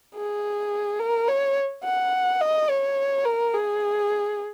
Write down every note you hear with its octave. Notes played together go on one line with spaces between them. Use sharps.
G#4
A#4
C#5
F#5
D#5
C#5
A#4
G#4